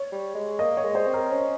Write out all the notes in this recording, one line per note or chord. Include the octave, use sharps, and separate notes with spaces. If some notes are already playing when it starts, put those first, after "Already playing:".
Already playing: C#5
G3
G#3
A#3 D#5
C#5
G#3
C5
C4
A#4
C#4